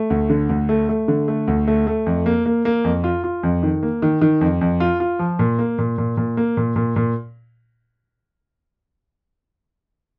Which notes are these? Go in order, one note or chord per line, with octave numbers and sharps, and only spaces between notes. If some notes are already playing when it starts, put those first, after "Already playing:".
Already playing: A3
D2
D3
D2
A3
A3
D3
A3
D2
A3
A3
F2
A#3
A#3
A#3
F2
F4
F4
F2
D#3
A#3
D#3
D#3
F2
F2
F4
F4
F3
A#2
A#3
A#2
A#2
A#2
A#3
A#2
A#2
A#2